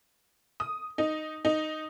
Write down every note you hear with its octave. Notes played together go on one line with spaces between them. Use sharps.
D#6
D#4
D#4